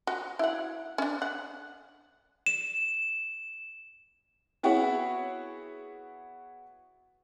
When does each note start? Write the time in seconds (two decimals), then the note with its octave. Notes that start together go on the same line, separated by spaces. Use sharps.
0.07 F#4
0.39 E4 F#5
0.98 C#4 D4
1.22 F#5
2.46 E7
4.63 B3 E4 F#4 G#4 C#5